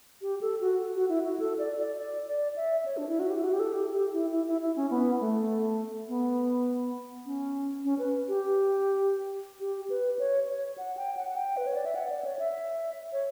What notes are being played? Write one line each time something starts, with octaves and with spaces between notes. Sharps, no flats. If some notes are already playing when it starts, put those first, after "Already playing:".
G4
A4
F#4
F#4
E4
F#4
A4
D5
D5
D5
D5
E5
C#5
D4
E4
F#4
G4
E4
F#4
G4
A4
G4
G4
E4
E4
E4
E4
C#4
B3
A3
B3
C#4
C#4
B4
G4
G4
B4
C#5
C#5
F#5
G5
F#5
F#5
G5
B4
C#5
D5
E5
F#5
D5
C#5
E5
C#5